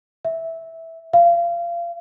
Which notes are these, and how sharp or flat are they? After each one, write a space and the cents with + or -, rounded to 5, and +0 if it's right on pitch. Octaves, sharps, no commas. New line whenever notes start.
E5 -10
F5 -25